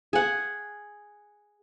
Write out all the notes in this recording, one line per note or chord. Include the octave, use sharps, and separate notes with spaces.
G#4 F#5